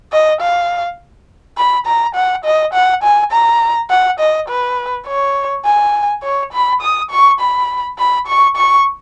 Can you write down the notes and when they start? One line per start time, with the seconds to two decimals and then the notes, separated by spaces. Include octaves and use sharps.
0.12 D#5
0.41 F5
1.57 B5
1.86 A#5
2.15 F#5
2.44 D#5
2.74 F#5
3.03 G#5
3.32 A#5
3.90 F#5
4.19 D#5
4.48 B4
5.06 C#5
5.65 G#5
6.23 C#5
6.52 B5
6.82 D#6
7.11 C#6
7.40 B5
7.98 B5
8.27 C#6
8.56 C#6